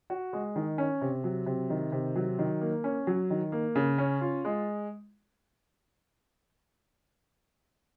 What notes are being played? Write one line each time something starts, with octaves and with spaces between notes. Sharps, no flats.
F#4
G#3
D#3
C#4
C3
F#3
C3
D#3
C3
F#3
D#3
A#3
C#4
F#3
D#3
A#3
C#3
C#4
F4
G#3